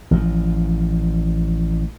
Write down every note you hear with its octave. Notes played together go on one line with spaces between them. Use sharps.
A1 F3